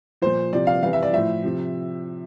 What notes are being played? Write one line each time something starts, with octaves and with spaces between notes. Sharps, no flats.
A#2 F3 C5
C3 F3 D5
F5
C3 E3 F5
E5
D5
A2 F3 E5
C3 F3